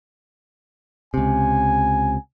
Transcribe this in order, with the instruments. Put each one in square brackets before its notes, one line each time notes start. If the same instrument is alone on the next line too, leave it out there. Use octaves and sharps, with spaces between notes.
[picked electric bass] C#2 C3 [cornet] G#5